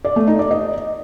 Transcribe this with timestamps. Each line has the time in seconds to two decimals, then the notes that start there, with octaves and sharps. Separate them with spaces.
0.05 D5
0.16 A3
0.28 D#4
0.39 D5
0.51 D#5